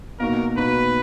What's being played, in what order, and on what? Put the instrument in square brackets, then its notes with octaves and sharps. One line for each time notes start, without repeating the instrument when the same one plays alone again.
[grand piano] B2 A#3 D#4 F#4 [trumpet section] A#4
[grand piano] B2 A#3 D#4 F#4 [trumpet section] B4